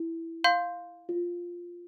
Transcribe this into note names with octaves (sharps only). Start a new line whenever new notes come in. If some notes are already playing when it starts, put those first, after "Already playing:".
Already playing: E4
F5 C6 G6
F4